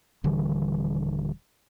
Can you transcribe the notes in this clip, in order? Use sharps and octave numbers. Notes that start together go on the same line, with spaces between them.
D#1 D3 E3 G3